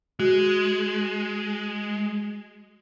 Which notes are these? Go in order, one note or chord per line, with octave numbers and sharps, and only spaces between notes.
G#3 F#4